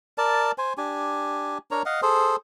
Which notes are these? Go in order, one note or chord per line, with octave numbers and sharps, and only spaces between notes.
A#4 D5 A5
C5 G#5
D4 G4 G#5
D4 A#4 C#5 A#5
D#5 F5 F#5
G#4 A4 C5